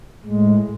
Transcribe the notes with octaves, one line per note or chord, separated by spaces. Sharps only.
A2 G#3